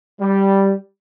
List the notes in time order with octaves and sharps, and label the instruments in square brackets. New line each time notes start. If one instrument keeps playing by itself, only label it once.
[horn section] G3